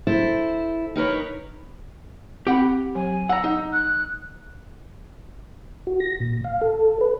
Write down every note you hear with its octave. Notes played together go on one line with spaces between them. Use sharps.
E4 A4 C5
D#4 A#4 B4 C#5
C4 G4 F#5 B5
F#3 G#5
F#5 A#5 E6
D#4
F#6
F#4
A#6
A#2
F5
A4
B4